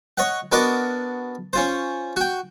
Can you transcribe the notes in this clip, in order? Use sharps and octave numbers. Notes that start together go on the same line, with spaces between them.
C#5 D#5 F#5
B3 D4 F#4 A#4 D5 D#5
C#4 F4 C5
F#4 G5